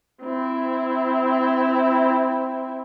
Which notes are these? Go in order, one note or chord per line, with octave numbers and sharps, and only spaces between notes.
C4 E4